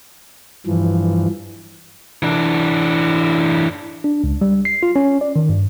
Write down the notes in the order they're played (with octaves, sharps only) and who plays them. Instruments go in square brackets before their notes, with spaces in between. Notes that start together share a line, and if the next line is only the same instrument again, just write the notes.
[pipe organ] G2 E3 F3
[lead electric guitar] E3 D4
[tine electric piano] D4
C#2
G3
C7
F4
C#4
D5
D#3
G2